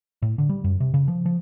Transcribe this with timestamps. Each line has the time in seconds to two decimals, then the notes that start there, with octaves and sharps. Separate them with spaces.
0.22 A2
0.38 D3
0.49 G3
0.64 F#2
0.80 C3
0.94 C#3
1.08 F3
1.26 F3